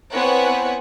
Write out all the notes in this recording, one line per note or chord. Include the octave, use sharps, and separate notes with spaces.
B3 C4 E4 C#5 F#5 G#5